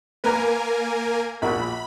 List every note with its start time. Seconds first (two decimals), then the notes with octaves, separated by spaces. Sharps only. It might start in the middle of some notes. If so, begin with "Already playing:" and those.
0.24 A#3 A#4 B4 G#5 A#5
1.42 A#1 A#2 F#4 B5